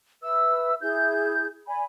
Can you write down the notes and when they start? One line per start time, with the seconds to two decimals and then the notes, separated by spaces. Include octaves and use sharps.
0.22 B4 E5 E6
0.80 E4 G#4 G6
1.67 D5 G#5 B5